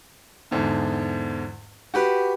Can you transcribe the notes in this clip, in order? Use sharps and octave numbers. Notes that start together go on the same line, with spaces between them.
E2 G#2 D3
F#4 G4 B4